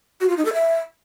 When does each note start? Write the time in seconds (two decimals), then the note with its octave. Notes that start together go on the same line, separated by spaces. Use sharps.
0.21 F#4
0.29 F4
0.37 D#4
0.45 A4
0.53 E5